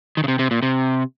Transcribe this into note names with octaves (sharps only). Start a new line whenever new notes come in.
D#3
C#3
C3
C3
A#2
C3